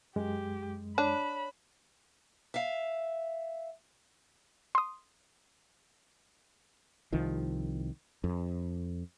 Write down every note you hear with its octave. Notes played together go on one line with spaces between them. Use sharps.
F#2 G#3 G4
D4 C#5 B5
E5 F5
C6 D#6
C2 D#3 F3
F2